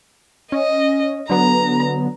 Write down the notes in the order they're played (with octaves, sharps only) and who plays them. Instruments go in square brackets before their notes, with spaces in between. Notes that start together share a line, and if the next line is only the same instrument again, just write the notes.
[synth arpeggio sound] C#4 [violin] D#5
[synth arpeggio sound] D3 F#3 B3 [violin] A#5